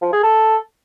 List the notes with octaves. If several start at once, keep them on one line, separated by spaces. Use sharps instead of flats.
F3
G#4
A4